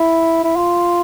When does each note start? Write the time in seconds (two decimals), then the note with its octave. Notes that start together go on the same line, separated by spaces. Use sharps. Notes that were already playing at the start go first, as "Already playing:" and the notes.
Already playing: E4
0.44 E4
0.56 F4